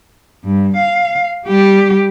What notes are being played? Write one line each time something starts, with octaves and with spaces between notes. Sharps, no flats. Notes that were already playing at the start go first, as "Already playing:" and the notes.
G2
F5
G3 G4